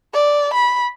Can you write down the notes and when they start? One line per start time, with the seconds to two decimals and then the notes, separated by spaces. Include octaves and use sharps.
0.14 D5
0.53 B5